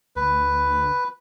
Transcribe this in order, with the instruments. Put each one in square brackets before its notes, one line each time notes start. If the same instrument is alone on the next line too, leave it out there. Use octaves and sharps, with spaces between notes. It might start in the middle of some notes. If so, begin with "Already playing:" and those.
[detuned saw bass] D2 [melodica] B4